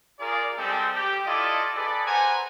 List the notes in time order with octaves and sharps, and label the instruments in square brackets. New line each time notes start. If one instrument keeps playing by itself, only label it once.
[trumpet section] F4 G#4 A#4 D5
G3 G#3 C4 A4
G4
E4 F4 A4 D5 D#5
G#4 A4 B4 D5
B4 C5 F#5 G#5 A#5